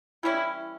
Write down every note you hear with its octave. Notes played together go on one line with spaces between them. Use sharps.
E3 G3 C#4 E4